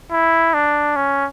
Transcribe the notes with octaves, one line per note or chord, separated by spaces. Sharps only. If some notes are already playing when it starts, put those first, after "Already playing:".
E4
D4
C#4